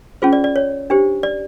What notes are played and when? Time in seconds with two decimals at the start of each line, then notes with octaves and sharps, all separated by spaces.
0.22 C#4 F4 G#4 C5
0.33 D5
0.44 D5
0.56 C#5
0.90 D4 G4 C5
1.23 D5